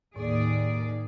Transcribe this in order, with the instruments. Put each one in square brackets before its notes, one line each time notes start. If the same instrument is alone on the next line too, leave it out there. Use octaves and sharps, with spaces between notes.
[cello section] D#2 G#4 D5 [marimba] A2